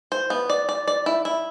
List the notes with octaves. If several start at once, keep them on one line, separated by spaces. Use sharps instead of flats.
C5
B3
D5
D5
D5
E4
E4